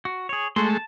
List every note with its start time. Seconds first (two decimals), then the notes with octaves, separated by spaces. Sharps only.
0.05 F#4
0.29 G#4 C#5
0.56 G#3 A3 F#4 A4 C6
0.70 A5